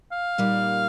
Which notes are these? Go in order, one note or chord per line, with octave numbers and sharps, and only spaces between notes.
F5
A#2 G3 A#3 D#4